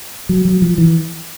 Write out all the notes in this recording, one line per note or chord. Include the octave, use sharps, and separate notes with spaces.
F#3
F#3
F3
E3